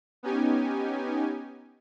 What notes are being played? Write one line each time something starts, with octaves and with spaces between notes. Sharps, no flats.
B3 C#4 D#4 G4 G#5